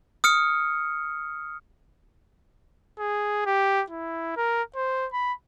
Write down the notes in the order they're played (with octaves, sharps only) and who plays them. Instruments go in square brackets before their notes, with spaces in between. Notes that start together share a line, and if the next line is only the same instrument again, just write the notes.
[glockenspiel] D#6 F6 C#7
[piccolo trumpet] G#4
G4
E4
A#4
C5
B5